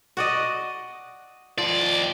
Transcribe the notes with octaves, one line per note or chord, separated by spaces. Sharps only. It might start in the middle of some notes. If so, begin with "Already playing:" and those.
F#4 D5 D#5
D#2 F3 D5